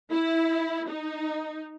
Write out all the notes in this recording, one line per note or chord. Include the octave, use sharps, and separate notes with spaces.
E4
D#4